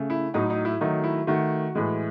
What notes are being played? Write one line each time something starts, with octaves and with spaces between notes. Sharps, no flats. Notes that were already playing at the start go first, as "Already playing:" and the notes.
Already playing: C#3 A3
E4
A2 F#3 A3 D#4
D#4
E4
D#3 F#3 A3 D#4
E4
D#3 A3 F#4
A2 E3 G#3